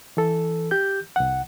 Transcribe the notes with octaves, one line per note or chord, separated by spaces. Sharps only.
E3 A4
G4 G6
C2 F#5